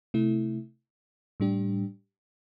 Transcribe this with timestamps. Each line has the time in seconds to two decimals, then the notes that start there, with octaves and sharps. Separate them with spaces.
0.14 C3 A3 E4
1.40 A2 G3 D4 G4